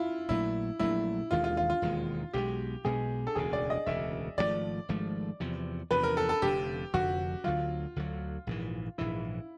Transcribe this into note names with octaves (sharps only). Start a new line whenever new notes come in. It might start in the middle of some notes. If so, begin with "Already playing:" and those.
Already playing: E4 F4
A#1 A#2 F#3 A3 E4
A#1 A#2 F#3 A3 E4
E1 D#2 D#3 G#3 F4
F4
F4
F4
E1 D#2 D#3 G#3
B1 B2 G#3 G4
B1 B2 G#3 G#4
A4
E1 D2 C#3 G#4
D5
D#5
E1 D2 C#3 E5
G#1 G#2 F3 A3 D5
G#1 G#2 F3 A3
E2 C3 F3
E2 C3 F3 B4
A#4
A4
A4
F1 F2 D3 G4
F1 F2 D3 F#4
D2 D3 F#3 F4
D2 D3 F#3
A#1 G#2 E3
A#1 G#2 E3 E4